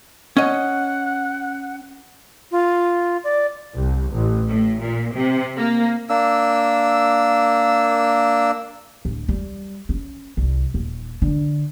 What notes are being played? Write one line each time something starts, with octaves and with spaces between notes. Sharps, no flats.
C#4 D#5 F#5
F4
D5
C2
A1
A2
A#2
C3
A#3
A#3 D4 E6
D1
G3
C#4
C2
D#1
D3